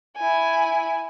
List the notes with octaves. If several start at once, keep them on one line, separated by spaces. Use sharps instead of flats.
E4 G#5